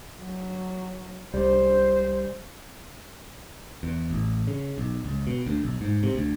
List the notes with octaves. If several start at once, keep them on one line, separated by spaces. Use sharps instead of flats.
F#3
C2 G3 C5
E2
A1
C#3
B1
C#2
B2
D2
B1
G#2
C3
D2